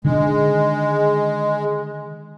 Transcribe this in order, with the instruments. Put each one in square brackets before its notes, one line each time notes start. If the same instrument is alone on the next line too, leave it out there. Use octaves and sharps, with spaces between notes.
[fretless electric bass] D3 D#3 D4 [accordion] G#3